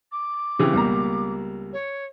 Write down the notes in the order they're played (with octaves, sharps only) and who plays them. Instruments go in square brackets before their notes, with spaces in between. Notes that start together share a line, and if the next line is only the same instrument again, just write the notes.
[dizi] D6
[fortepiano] C#3 E3 [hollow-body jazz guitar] C4 G4
[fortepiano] C#2 B2 A#5 [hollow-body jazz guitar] G3 A#3
[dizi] C#5